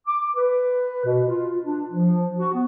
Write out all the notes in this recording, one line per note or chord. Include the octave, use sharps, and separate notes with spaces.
D6
B4
B2
F4
D4
F3
F#4
B3